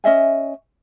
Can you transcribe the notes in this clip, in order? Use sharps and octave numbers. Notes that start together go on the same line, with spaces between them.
C#4 D#5 E5 G#5